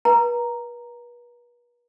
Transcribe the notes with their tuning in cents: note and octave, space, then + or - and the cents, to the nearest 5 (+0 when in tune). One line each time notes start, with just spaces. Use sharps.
B4 -40 A#5 +0